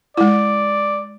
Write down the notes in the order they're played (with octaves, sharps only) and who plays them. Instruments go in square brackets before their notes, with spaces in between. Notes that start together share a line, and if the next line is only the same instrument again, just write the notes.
[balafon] G#3 E4 [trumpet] D5